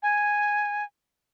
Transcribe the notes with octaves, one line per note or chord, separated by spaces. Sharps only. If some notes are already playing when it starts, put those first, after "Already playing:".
G#5